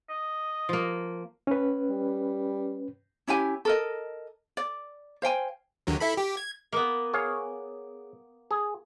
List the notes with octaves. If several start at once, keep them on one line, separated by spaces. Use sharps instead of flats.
D#5
F3 A#3
C#4 B4
G3
C#4 E4 G4 G#5
A4 A#4 D#5
D5
C5 F5 G5 G#5
D#2 D3 F#3
E4 A4 B5
G4
G#6
A#3 B3
G#4 C#5 F5
G#4